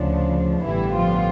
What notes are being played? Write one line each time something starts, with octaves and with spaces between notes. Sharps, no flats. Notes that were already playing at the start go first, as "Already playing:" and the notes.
Already playing: D2 C#3 F3 D4
A1 G2 D3 E3 G3 B3 E4
F3 F4